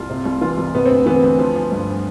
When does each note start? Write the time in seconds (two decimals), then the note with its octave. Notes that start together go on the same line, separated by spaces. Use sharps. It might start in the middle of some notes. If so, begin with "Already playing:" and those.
Already playing: C2 F4
0.10 C3
0.26 C2
0.41 E3 F4
0.58 C2
0.75 C3 B3
0.86 D2 C4
1.06 E3 B3
1.23 D2
1.39 F3
1.55 F3
1.72 G2